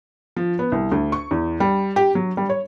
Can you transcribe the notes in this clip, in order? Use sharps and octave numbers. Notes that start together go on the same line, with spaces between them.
F3
B3
C2
D2
C#6
E2
G3
G4
F#3
G3
C#5